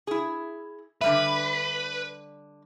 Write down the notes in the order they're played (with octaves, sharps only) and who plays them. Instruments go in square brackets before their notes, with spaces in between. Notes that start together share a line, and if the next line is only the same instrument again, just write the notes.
[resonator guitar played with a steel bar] E4 G#4
[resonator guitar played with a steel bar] D3 G3 E5 [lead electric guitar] B4